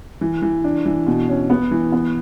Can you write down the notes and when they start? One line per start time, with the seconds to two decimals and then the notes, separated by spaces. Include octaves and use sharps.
0.21 E3
0.42 E3
0.64 D4
0.85 E3
1.07 B2
1.28 C#4
1.50 B3
1.71 E3
1.92 B3